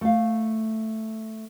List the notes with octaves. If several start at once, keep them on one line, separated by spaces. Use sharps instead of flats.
A3 F5